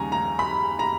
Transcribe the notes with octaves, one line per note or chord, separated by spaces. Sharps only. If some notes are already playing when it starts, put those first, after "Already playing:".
Already playing: D#2 C#3 G3 G#5 A#5
A#5
B5
A#5